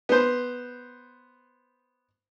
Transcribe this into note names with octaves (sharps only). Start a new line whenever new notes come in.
B3 C5